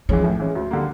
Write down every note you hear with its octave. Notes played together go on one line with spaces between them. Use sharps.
E3 F3 G#3 C#4
A2
E3 G#3 C#4
D2
D3 G3 A#3